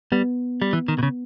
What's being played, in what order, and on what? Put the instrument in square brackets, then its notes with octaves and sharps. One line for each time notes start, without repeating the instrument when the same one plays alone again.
[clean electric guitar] G3 [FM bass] B3
[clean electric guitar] G3
E3
D#3
B2
C#3